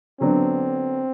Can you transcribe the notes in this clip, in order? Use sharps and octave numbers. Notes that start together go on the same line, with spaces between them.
D3 F#3 B3 C4 D4